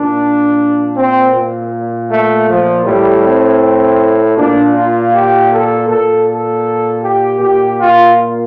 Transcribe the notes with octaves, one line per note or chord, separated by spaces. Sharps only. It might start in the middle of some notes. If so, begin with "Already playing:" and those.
Already playing: A#2 D4
C4
A#2
A3
F3
A2 G3
C4
A#2 D4
F4
G4
A4
A#2 A4
A4
G4
A#2 G4
F4